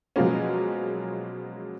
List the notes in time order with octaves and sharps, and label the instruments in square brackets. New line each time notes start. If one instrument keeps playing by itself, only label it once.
[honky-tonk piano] B2 F3 F#3 G#3 A#3 C#4